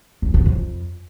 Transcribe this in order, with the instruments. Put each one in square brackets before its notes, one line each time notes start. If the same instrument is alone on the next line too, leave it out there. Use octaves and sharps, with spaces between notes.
[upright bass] E2
C#3
F2